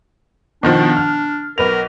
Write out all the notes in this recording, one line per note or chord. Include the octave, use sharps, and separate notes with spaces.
B2 D#3 F3 D4
F6
B1 A#4 B4 F7